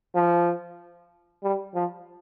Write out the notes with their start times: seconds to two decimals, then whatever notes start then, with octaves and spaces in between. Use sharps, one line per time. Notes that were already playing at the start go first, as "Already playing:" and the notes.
0.15 F3
1.43 G3
1.75 F3